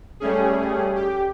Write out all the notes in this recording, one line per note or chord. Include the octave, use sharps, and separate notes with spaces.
G3 A3 C#4 G#4
G4